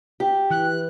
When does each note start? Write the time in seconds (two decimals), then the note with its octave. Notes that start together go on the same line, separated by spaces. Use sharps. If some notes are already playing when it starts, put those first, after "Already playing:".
0.20 G4
0.50 E3 F#6